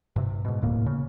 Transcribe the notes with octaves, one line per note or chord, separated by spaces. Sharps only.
G2 C3
G#2 B2
D#1 D2 A2 A#3
C#3